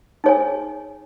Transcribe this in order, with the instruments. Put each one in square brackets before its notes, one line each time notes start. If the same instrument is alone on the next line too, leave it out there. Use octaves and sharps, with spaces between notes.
[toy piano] D#4 G#4 C#5 G#5